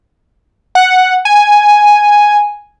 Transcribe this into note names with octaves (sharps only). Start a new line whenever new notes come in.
F#5
G#5